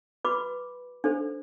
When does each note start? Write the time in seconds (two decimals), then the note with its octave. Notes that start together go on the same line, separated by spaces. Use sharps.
0.25 F#4 B4 B5 D6
1.04 D4 A4 C5